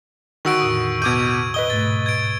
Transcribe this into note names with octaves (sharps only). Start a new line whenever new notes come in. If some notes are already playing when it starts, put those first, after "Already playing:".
D3 D#3 F#4 F#5 C#6 E6 D7
E2 A2 D#6
B2 D6 G6 G#6 D#7
B4 D#5 D#6 G7
G#2 B2 A3 A6
G#6 D7